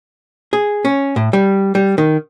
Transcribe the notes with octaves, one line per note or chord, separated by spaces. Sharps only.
G#4
C#4
A2
G3
G3
D#3